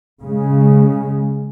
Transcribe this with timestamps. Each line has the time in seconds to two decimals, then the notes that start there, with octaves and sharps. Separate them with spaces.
0.24 C#3 G#3